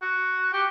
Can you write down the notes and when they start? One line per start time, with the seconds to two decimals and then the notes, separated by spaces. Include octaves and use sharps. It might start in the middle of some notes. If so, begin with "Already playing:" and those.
0.02 F#4
0.53 G4